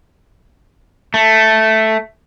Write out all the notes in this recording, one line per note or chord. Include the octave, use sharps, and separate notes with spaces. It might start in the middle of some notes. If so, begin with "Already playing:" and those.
A3